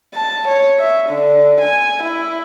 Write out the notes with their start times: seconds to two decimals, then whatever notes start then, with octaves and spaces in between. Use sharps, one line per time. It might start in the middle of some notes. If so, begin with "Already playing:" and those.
0.14 A5
0.48 C#5
0.80 E5
1.09 D3
1.61 G#5
2.03 E4